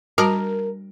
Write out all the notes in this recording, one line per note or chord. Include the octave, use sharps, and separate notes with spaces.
G3 F#4 A#4 A5